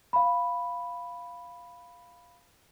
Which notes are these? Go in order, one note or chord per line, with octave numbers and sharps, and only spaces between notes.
F5 B5